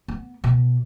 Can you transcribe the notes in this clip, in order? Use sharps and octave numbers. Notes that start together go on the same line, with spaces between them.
B3
B2